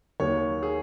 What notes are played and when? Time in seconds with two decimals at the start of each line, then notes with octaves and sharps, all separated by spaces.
0.20 D#2 D#3 F#3 C#5
0.63 G#4